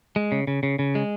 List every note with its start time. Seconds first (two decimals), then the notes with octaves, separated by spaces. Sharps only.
0.16 G#3
0.32 C#3
0.47 C#3
0.63 C#3
0.79 C#3
0.95 G#3